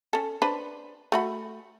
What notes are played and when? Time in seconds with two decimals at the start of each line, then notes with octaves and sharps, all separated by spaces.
0.13 C#4 A4
0.42 D4 B4 C5
1.12 A3 F#4 B5